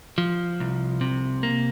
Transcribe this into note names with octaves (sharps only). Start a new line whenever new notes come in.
F3
C2
C3
A#3